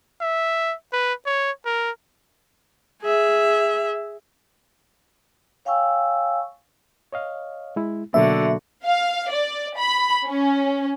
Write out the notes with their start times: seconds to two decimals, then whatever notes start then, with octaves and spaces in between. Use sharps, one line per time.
0.21 E5
0.93 B4
1.26 C#5
1.66 A#4
3.02 G#4 E5
5.65 C#5 F5 G5 G#5 C#6 E6
7.13 C#5 D#5 F5
7.76 G#3 E4
8.14 B2 D3 F#3 A#3 F#4 E5
8.85 F5
9.32 D5
9.78 B5
10.27 C#4